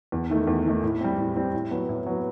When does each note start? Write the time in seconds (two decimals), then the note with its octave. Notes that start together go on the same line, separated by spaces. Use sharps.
0.12 E2
0.30 D#3 A3 D#4
0.47 E2
0.66 D#3 A3 D#4
0.83 A2
1.01 G3 C4
1.18 A2
1.36 G3 C4
1.54 A2
1.71 F#3 B3
1.89 A2
2.06 F#3 B3